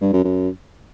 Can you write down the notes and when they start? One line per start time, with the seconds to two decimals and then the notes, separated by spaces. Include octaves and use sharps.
0.01 G2
0.13 F#2
0.24 F#2